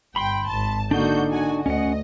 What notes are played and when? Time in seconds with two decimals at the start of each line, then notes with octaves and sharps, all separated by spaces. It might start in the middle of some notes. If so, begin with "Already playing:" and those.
0.16 G1 G5 B5 C6
0.48 G#1 A5
0.91 D3 A#3 D4 D#4 F#4 G6
1.30 F#4 G#5
1.66 D2 C#4 D#5 F#5